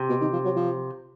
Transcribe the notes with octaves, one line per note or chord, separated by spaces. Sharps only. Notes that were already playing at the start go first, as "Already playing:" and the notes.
Already playing: C3
B2
D#3
F3
F#3
F3